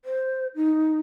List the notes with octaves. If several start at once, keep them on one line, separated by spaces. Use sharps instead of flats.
C5
D#4